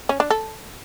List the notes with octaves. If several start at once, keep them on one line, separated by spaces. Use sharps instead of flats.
C#4
D4
A4